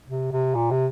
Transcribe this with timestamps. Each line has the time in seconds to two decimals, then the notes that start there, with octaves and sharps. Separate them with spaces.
0.09 C3
0.33 C3
0.55 A#2
0.71 C3